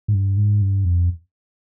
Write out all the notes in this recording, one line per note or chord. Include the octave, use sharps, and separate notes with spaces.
G#2
G2
G#2
G2
F2